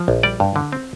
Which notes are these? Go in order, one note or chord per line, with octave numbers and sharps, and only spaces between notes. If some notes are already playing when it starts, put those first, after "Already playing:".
Already playing: F3
A#1
G3 D5
G2
D3
C4